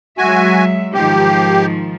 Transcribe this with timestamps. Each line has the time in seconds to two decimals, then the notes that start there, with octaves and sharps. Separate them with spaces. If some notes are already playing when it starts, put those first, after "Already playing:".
0.18 F#3 G#3 F#4 E5 G#5
0.94 G#2 D#3 F3 G4